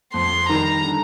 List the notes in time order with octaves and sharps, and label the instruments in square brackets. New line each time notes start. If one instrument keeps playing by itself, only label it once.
[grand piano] F2 [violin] C6
[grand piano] D#3 G3 [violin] A#5
[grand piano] D3